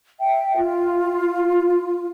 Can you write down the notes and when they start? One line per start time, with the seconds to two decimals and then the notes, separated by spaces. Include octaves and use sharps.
0.20 E5 G5
0.57 F4